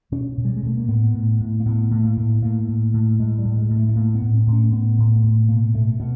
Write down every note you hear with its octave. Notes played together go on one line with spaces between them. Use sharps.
B2 C#4
B2
G3
G#3
B2 A3
A#3
A2 B3
A2
A2
A#3
A2 B3
A2
A#3
A2
A2 A#3
A2
A2
A2 G#3
G3
A2
G#3
A2
A3
A3
A2 A#3
B3
A2
C4
A2
C#4
A2 B3
A2
A2
B2 A#3
B2 A3
B2 B3